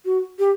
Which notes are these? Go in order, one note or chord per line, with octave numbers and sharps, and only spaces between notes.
F#4
G4